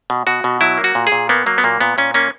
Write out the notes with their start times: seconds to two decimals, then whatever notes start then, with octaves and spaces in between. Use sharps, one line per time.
0.10 B2
0.27 B2 F#4
0.44 B2
0.61 F#3 E4
0.78 A#3
0.84 F#4
0.95 A#2
1.07 G#4
1.12 A#2
1.29 A#3 B3
1.46 F#3 A#3
1.58 B3
1.64 A#2 A#3
1.80 A#2 B3
1.98 A#2 C#4
2.14 A#3 C#4